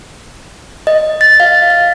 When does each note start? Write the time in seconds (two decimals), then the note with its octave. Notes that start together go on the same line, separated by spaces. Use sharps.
0.87 D#5
1.21 A6
1.40 F5
1.70 F5